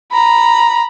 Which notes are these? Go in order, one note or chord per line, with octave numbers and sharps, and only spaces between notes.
A#5 B5